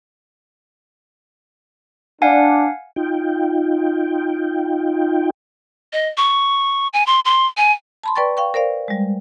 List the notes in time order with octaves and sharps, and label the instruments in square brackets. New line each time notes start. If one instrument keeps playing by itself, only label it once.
[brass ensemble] D4 [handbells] F5 F#5 G#5
[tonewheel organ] D#4 F4 G5
[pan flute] D#5
C#6
G#5
C6
C6
G#5
[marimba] A5 B5 C6
B4 D5 G5 C#6 A6
F5 G5 C#6
A#4 C5 D5 F5
G3 G#3